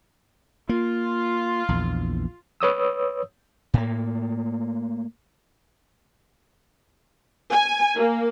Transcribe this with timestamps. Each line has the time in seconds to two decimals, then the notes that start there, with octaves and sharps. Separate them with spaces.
0.69 A#3 F4
1.69 A#1 E2
2.60 B4 C#5 D#6 E6
3.74 A2 A#3
7.52 G#5
7.96 A#3